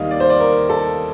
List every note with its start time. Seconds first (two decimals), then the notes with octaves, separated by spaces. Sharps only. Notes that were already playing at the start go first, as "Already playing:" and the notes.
Already playing: D#2 D#3 G3 D#5 F5
0.11 D5
0.20 C5
0.30 D5
0.40 A#4
0.70 A4